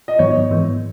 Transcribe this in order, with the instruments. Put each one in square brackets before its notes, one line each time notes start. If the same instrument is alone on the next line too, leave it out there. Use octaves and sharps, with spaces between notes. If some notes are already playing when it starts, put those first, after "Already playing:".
[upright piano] D#5
[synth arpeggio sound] G#2 D#3 F#3 B3 [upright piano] C#5
[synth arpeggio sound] G#2 E3 G#3 B3